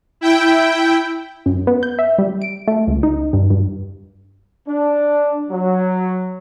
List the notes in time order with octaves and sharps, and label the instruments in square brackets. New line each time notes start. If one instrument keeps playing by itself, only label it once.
[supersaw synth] E4 G5
[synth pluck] F#2
B3
G6
E5
G3
D7
A3
C#2
D#4
G2
G2
[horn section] D4
F#3